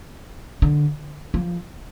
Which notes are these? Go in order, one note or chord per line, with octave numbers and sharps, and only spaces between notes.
D3
F3